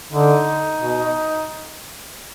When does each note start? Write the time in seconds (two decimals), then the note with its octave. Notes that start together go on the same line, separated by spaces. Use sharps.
0.12 D3 D#4
0.80 B2